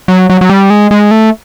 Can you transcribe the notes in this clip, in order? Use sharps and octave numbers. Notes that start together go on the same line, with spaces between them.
F#3
F#3
F#3
G3
G#3
G#3
A3